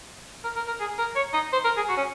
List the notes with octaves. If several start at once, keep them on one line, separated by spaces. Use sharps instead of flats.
A#4
A#4
A#4
G#4
A#4
C#5
D#4
C5
A#4
G#4
F#4
C#4